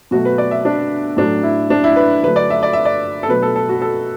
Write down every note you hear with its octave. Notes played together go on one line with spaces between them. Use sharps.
B2 F#3 A3 F#4
B4
D5
E5
D4
A2 F#3 A3 D4
E4
D4
E4
B4
D3 F#3 A3 B4
D5
E5
D5
E5
D5
A4
B2 F#3 A3 B4
A4
A4
F#4
A4